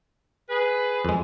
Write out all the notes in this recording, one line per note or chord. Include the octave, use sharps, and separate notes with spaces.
G#4 B4
F2 G#3